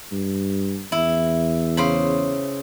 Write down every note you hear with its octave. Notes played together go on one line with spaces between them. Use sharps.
G2
E2 E4
C#3 C5 B5